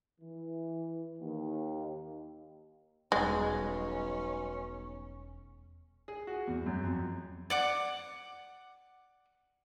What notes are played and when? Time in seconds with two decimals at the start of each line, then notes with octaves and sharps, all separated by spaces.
0.21 E3
1.18 D#2
3.12 E1 B1 G3 G#3 C#4
6.08 G#4
6.27 F#4
6.47 E2
6.66 F#2
6.83 F2
7.50 D5 F#5 D6